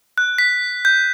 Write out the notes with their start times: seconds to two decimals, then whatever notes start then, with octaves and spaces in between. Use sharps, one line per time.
0.18 F#6
0.38 B6
0.85 G6